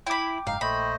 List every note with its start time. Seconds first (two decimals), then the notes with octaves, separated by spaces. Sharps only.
0.07 E4 G5 B5 D6
0.47 F#1 G#2 D#4 F5
0.61 A#1 A3 C5 D#5 B5